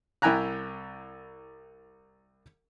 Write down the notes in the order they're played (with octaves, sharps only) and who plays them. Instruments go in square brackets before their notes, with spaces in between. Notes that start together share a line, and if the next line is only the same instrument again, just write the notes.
[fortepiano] C2 E4 G5 G#5 A#5 F#6